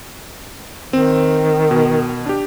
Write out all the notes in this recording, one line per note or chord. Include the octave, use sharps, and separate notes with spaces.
D#3 C4
B2
D4 G4